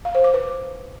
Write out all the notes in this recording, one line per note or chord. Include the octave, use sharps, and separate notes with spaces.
F5
C5
D6
B4